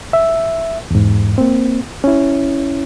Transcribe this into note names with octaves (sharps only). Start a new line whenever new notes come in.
E5
E2 G#2
A#3 C4
C#4 E4